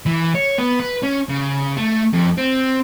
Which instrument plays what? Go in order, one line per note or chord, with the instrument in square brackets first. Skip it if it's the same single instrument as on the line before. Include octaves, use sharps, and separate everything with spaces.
[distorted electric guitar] E3
C#5
B3
B4
C#4
C#3
A3
F2
C4